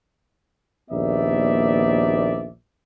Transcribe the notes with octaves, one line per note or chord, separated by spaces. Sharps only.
A#1 D#2 B3 D#4 D5 E5